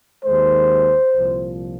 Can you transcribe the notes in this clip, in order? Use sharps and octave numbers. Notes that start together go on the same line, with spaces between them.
D#2 D#3 G#3 C5
C2 A#2 F3